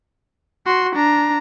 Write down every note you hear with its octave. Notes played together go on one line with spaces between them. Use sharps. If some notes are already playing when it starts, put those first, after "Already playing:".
F#4 C6
D4 A#5